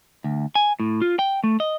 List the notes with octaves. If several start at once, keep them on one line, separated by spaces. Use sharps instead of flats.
D2
G#5
A2
F4
G5
A3
D#5